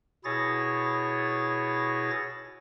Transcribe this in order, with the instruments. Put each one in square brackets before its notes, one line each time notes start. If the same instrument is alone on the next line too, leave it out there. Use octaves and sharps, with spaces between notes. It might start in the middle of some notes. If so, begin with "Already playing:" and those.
[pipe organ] B2 E4 G#4 C#5 A6 A#6